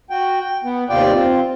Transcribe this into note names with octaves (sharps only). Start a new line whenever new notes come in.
F#4 G5
G5
B3
D#2 C3 F4 D5 G5
C4 F4